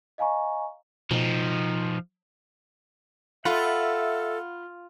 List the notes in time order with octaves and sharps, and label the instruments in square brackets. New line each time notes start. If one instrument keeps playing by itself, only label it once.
[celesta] D#5 F5 G#5 A#5 C#6
[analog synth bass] B2 [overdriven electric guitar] F3 D#4
[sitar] F4 [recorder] A4 [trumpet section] E5 [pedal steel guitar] F#5 B5